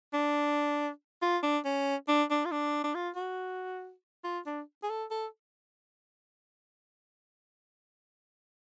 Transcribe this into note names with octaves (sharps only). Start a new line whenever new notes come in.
D4
F4
D4
C#4
D4
D4
F4
D4
D4
F4
F#4
F4
D4
G#4
A4
A4